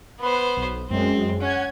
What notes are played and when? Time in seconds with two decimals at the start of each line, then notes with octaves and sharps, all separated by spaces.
0.20 B3 B4 C5
0.56 B1
0.90 F#2 G#3 C4
1.41 C#4 F#5 G#6